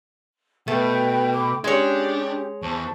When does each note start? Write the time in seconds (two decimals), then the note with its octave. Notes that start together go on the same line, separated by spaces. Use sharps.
0.68 B2 A3 B4 G5
1.34 G5 B5 D6
1.64 G#3 C#4 D4 G4 C#5
2.62 E2 C5 A5 C#6